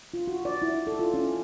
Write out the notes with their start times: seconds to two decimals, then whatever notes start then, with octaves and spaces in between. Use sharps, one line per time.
0.14 F4
0.27 F#4
0.45 D5
0.62 E4
0.87 A4
0.99 F4
1.14 C#4